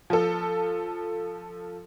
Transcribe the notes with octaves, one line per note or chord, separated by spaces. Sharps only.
F3 A4